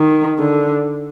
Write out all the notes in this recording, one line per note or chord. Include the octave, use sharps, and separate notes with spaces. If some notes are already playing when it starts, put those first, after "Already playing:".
Already playing: D#3
D3